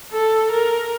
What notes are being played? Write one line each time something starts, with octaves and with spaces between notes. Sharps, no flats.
A4
A#4